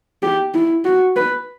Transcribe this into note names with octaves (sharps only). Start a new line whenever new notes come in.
G4
E4
F#4
B4